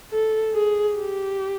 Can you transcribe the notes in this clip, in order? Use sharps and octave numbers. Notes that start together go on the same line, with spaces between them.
A4
G#4
G4